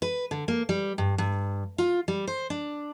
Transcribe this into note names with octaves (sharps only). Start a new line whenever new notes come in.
B4
D3
A#3
G3
G2
G2
F4
G3
C5
D4